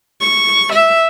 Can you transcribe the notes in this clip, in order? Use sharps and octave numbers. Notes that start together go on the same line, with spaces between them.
C#6
E5